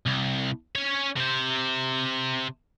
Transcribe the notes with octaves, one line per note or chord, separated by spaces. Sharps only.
C2
C#4 C#5
C3 C5